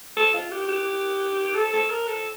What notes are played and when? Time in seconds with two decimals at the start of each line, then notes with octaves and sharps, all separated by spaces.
0.16 A4
0.34 F4
0.51 G4
0.68 G4
1.55 A4
1.73 A4
1.90 A#4
2.07 A4